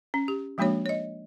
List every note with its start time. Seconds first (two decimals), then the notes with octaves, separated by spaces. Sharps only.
0.14 C#4
0.28 G4
0.58 F3 G#3 A#3 D4 F#4 C#5
0.86 C#5 D#5